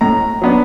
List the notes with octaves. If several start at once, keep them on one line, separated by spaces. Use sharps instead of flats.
A2 A#5
F#3 B3 D4